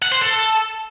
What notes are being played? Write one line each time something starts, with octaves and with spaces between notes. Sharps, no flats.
F#5
C5
A4